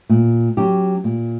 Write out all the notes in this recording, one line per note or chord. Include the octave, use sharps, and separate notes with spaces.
A#2
F#3 C#4 G4
A#2